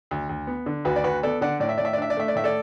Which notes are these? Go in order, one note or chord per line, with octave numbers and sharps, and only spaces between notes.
D2
D2
B3
D3
D2 F#4 B4
D5
D2 F#4 B4
B3 A4 D5
D3 D5 F#5
A2 D5
E5
A2 D5
E5
D5
D4 E5
D5
A3 E5
D5
A2 E5
A4 D5